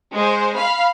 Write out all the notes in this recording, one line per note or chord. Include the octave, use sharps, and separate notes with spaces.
G#3 C5
F5 B5